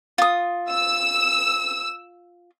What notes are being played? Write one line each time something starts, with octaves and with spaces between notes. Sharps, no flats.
F4 D#6
E6